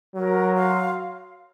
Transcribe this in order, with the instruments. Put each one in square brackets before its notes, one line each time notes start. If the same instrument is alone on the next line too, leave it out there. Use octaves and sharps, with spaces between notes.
[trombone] F#3 [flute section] A#4
[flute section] F5 C6